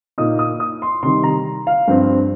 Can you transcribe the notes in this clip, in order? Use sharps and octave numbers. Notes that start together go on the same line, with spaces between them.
A#2 A#3 D#4 D#6
D#6
D#6
C6
C3 D#3 G3 C6
A#5
F5
G2 F3 C4